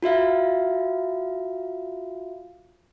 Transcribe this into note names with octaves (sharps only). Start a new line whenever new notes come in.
F4 F#4 E5 F5